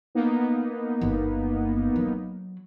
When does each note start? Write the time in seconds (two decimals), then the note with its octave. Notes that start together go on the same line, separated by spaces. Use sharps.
0.15 A#3 B3 D#4
1.02 G1
1.96 F#3